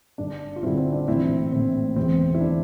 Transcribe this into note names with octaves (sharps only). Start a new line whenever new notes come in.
G1 G2 D3 D4
F4
G1 G2 D3 C4 E4
C4
D4
A#1 A2 E3 C4 E4
A#1 A2 E3 C4
E1 E2 E3 C4
E4
E3 D4